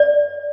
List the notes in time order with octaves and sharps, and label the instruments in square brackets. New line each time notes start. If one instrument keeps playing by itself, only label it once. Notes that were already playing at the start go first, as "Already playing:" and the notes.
Already playing: [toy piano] D5